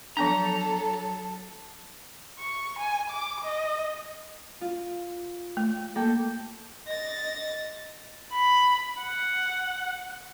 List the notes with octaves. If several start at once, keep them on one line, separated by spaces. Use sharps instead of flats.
F3 F#3 B3 D4 A4 A5 A#5
C#6
G#5
D6
D#5
F4
A3
A#3 A4 G5
D#5 A6 A#6
B5
F#5